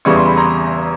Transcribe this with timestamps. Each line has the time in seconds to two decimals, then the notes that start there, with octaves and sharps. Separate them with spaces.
0.05 E2 C#3 E3 G3 C#6
0.16 C6
0.26 B5
0.36 A#5 C6